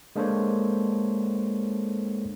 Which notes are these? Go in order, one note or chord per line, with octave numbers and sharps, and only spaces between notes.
G#3 A#3 D4 A4 C5 C#5